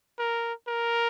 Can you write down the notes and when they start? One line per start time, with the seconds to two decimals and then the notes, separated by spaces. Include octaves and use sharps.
0.19 A#4
0.68 A#4